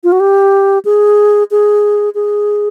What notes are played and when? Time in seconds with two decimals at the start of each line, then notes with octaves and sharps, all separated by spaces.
0.04 F4
0.12 F#4
0.20 G4
0.85 G#4
1.51 G#4
2.15 G#4